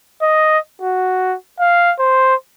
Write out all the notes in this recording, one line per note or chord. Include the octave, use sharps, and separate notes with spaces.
D#5
F#4
F5
C5